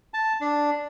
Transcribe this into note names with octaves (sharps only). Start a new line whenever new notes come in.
A5
D4